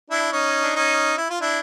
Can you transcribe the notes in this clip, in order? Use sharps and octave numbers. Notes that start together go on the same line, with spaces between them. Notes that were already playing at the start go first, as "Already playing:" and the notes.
D4 E4
C#4 D#4
D4
C#4 D#4
E4
F4
D4 E4